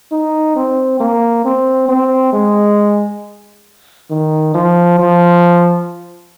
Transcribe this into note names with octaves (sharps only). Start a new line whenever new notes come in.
D#4
C4
A#3
C4
C4
G#3
D#3
F3
F3